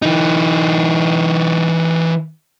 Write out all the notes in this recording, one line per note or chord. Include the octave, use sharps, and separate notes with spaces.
E3 D#4